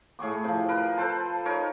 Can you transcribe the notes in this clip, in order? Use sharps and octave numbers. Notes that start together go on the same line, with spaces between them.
A2 G#4 C#6 D6
C3 F3
A#4 B4
A4 B4 C5 A5
D#4 A#4 C#5